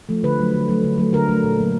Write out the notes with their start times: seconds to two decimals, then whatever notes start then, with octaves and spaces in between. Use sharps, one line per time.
0.09 F3 A3
0.23 D3 B4
0.39 F#3 A3
0.54 D3
0.69 F#3 A3
0.84 D3
0.98 F#3 A3
1.13 D3 A#4
1.28 F#3 A3
1.44 A#2
1.59 F#3 A#3